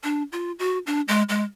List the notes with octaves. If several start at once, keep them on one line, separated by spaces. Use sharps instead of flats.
D4
F4
F#4
D4
G#3
G#3